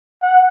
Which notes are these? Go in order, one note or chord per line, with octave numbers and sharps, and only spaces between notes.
F#5